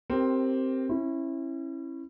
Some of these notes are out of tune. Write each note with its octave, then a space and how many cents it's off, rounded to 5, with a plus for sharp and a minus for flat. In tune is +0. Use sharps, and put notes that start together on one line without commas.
C4 +5 G4 -15 A#4 +0
C#4 -35 E4 +0